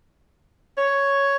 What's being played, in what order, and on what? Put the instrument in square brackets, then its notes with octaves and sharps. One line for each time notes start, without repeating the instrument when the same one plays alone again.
[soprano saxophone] C#5